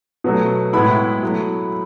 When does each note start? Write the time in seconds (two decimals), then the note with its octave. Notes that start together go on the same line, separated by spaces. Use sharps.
0.24 B2 F#3 A3
0.73 A2 G#3 B3 E4 B5
1.23 F#3 A3 E4